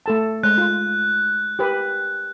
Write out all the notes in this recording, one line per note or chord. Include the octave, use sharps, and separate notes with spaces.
A3 A4 A5
G#3 F#6
F4
G4 A#4 B4